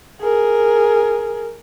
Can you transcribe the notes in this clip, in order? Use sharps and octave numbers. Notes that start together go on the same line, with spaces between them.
G#4 A#4